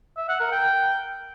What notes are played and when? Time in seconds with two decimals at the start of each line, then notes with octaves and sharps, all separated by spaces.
0.17 E5
0.29 F#5
0.40 A#4
0.52 G5